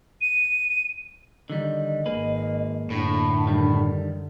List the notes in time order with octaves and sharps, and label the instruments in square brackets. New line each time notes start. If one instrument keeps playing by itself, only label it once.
[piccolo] D#7
[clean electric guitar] D3 D#3 G3 [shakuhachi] D#5
[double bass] G#1 [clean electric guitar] A#3 G#4 B4
[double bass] F#2 D3 [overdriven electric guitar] A2 [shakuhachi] D4
[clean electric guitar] D#3 G3